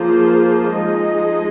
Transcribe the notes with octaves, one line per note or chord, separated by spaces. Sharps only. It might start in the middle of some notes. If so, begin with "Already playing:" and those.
Already playing: F3 A#3 F4 G#4 C5
F3 G#3 D#4 G#4 D#5